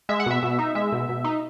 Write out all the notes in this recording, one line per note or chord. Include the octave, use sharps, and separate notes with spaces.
G#3 E5
F#5
B2 E5
B2
D#4
G#3 E5
B2
B2
D#4